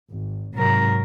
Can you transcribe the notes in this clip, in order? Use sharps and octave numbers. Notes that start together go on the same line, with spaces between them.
G#1
G#2 C3 F#3 A#4